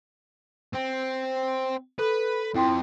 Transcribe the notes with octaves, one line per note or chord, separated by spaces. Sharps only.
C4
A4 B4
F2 E4 G5 C6